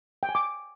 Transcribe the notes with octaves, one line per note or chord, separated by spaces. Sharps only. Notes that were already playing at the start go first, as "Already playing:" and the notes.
G5
G#5
D6